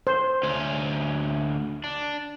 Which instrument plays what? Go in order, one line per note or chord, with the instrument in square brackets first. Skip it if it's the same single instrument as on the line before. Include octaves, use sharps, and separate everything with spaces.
[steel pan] C5
[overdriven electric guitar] D2 C#4
D4